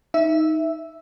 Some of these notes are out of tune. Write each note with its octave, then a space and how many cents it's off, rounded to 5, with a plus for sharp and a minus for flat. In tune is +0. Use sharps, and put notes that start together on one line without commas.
D#4 +10 E5 +0